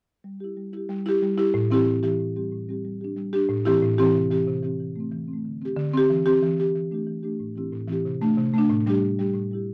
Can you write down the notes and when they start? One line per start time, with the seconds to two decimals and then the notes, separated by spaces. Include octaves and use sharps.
0.24 G3
0.40 E4 G4
0.57 G3
0.73 E4 G4
0.89 G3
1.06 E4 G4
1.22 G3
1.38 E4 G4
1.54 A2
1.70 E3 C4 E4 G4
1.87 A2
2.03 E3 C4 E4 G4
2.19 A2
2.36 G3 C4 G4
2.52 A2
2.69 G3 C4 G4
2.85 G3
3.01 D4 G4
3.17 G3
3.33 D4 G4
3.49 A2
3.65 E3 C4 E4 G4
3.82 A2
3.98 E3 C4 E4 G4
4.15 C3
4.31 E3 C4 G4
4.48 C3
4.63 E3 C4 G4
4.80 E3
4.96 A3 C4
5.12 E3
5.28 C4
5.33 A3
5.45 D3
5.61 C4 G4
5.76 D3
5.94 C4 G4
6.10 E3
6.26 C4 G4
6.43 E3
6.59 C4 G4
6.75 E3
6.91 A3 D4 G4
7.07 E3
7.23 A3 D4 G4
7.40 A2
7.56 E3 C4 E4 G4
7.73 A2
7.88 E3 C4 E4 G4
8.05 C3
8.21 A3 D4
8.37 C3
8.54 A3 D4
8.70 A2
8.86 G3 D4 G4
9.03 A2
9.19 G3 D4 G4
9.34 A2
9.51 G3 E4 G4